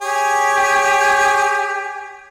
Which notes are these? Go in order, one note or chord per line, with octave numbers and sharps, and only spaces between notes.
G4 G#4 C#5